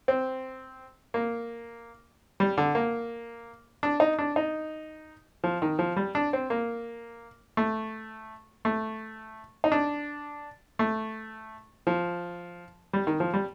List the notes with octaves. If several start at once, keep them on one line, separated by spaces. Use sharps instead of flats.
C4
A#3
G3
D3
A#3
D4
D#4
D4
D#4
F3
D#3
F3
G3
D4
C4
A#3
A3
A3
D#4
D4
A3
F3
G3
D#3
F3
G3